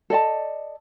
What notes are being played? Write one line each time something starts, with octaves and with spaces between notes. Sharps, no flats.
A4 D5 D#5 A5